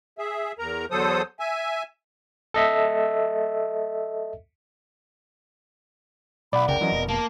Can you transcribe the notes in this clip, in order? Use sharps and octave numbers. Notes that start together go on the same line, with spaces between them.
G#4 E5
E2 A#4 A#5
E2 D3 F#3 A4 C5 D#6
E5 G#5
A4 D#5 E5
B1 D5 F#5 B5
F1 C2 C#3 A#4 G5
E3 F#3 C#4 D#5
F1 B2
A#3 A5